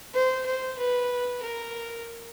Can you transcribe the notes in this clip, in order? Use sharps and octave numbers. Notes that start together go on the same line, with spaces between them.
C5
C5
B4
A#4